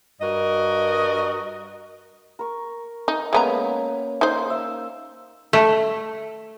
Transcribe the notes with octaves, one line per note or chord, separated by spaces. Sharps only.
G2 F#4 A#4 D#5
A#4 C#6
D#4
G#3 A#3 B3 C#4 A#5
D#4 C5
E5 E6
A3